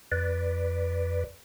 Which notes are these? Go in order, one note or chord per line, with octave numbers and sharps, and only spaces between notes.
F2 B4 D5